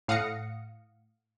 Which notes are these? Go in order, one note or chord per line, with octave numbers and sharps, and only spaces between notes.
A2 F5 F#5 D#6 A#6 C#7